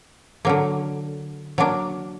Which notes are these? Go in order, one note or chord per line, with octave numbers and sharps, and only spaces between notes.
D3 F#3 A#3
F#3 A#3 D4